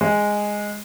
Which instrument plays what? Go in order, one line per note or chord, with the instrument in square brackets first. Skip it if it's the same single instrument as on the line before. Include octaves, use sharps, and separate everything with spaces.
[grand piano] G#3